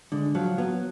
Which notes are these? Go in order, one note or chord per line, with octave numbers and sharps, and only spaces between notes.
D3 G#3
F3 F#3
F#3 B3